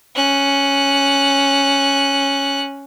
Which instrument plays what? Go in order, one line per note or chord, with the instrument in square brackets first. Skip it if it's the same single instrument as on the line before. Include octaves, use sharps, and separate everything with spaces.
[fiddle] C#4 F#6